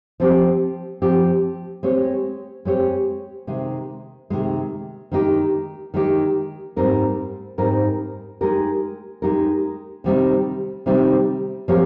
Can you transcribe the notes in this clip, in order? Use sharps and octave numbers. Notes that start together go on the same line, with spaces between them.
F3 C4 G4
F3 C4 G4
G#3 C4 G4 C#5
G#3 C4 G4 C#5
C3 D#3 G#3
C3 D#3 G#3
D#3 G#3 D#4 G4
D#3 G#3 D#4 G4
G#2 G3 C4 D#4 A#4
G#2 G3 C4 D#4 A#4
G#3 D#4 G4 A#4
G#3 D#4 G4 A#4
C3 D#3 G3 C4 D#4
C3 D#3 G3 C4 D#4
F3 C4 G4 A#4 C#5